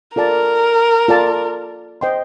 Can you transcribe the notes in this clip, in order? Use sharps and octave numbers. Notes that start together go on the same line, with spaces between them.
F4 A4 A#4 D5 A5
F4 A4 D5 A5
C5 D#5 G5 C6